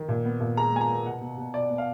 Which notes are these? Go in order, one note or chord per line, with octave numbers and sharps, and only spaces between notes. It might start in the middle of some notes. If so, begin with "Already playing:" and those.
Already playing: D#3
A#2
B3
A#2
G#3 A#5
B3 G#5
A#5
B3
B2 F#5
B2
B2
B2 D5
B3
F5